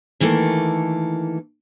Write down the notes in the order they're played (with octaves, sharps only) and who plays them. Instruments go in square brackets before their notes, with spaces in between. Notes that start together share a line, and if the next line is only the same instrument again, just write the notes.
[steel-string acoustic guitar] D#3 E3 A3 A#3 A4